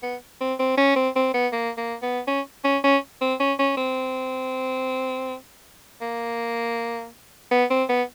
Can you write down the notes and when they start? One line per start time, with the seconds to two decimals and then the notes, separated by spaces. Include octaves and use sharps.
0.03 B3
0.41 C4
0.59 C4
0.78 C#4
0.96 C4
1.16 C4
1.34 B3
1.52 A#3
1.78 A#3
2.03 B3
2.27 C#4
2.65 C#4
2.84 C#4
3.21 C4
3.40 C#4
3.59 C#4
3.77 C4
6.02 A#3
7.51 B3
7.70 C4
7.89 B3